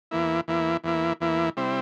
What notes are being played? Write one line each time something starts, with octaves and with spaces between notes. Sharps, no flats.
E2 E3 A#3 E4
E2 E3 A#3 E4
E2 E3 A#3 E4
E2 E3 A#3 E4
C3 G3 C4 E4